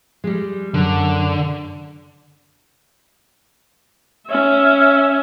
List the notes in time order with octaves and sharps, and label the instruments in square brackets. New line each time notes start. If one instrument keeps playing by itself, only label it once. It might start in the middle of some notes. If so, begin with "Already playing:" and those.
[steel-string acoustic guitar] G3 G#3
[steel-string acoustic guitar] F#2 [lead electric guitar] D3
[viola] C#4 E5